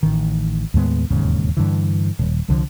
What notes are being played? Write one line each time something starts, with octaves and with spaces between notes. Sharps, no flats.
A1 D#3
D#2 A2 G#3 B3
E1 D#2 G#2 C#3
G2 D3 E3
D#1
C2 D3 E3 F3